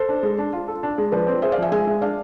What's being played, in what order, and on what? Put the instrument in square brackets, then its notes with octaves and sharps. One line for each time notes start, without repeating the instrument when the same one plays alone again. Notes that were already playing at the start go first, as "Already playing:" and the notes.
Already playing: [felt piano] A4 C5
[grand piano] D4
G#3
D4
F4
A4
D4
G#3
[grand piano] F3 [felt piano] B4 D5
[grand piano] C4
[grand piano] G#4 [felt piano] C5 E5
[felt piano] D5 F5
[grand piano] F3 [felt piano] E5 G#5
[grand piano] G#3 [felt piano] E5 G#5
[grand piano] G#3
[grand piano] D4 [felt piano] D5 F5